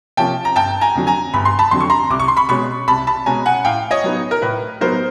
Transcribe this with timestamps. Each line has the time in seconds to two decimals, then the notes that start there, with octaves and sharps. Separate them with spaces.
0.17 C3 F3 A#3 C#4 G5 A5
0.45 A#5
0.56 G1 G5 A5
0.81 G#5 A#5
0.95 F2 D3 F#3
1.07 G#5 A#5
1.33 G1 B5
1.45 C6
1.59 A5 B5
1.71 F2 D3 F#3 C6
1.81 C#6
1.90 A#5 C6
2.10 C2 D6
2.20 C#6
2.28 C6
2.37 B5 C#6
2.49 B2 G#3 C#4 B5 C#6
2.88 C2 A5 B5
3.07 A5 B5
3.26 B2 G#3 C#4 G#5 A#5
3.46 F#5 G#5
3.65 A2 F5 G5
3.91 C#5 D#5
4.04 F#3 B3 D#4
4.31 A#4
4.42 A2 B4
4.81 F#3 B3 D#4 A#4 C5